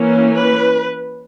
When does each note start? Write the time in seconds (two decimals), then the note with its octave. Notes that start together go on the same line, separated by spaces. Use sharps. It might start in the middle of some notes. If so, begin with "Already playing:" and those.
Already playing: E3 A#3 C#4
0.38 B4